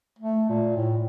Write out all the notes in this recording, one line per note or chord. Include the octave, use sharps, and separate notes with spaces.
A3
A#2
A2